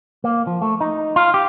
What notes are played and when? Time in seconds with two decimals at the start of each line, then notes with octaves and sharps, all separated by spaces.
0.24 A#3
0.47 F3
0.62 A3
0.81 D#4
1.16 F4
1.34 G4